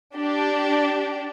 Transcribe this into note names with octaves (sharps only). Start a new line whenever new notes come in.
D4 G4